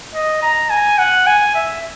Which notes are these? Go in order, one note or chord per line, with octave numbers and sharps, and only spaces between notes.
D#5
A#5
G#5
F#5
G#5
E5